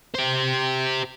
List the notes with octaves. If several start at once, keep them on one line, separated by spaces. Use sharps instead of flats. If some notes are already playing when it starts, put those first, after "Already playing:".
G4 C5